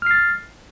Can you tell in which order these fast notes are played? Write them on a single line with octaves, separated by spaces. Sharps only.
F6 C7 A6